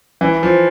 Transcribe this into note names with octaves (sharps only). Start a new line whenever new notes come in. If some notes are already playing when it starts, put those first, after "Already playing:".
E3
F3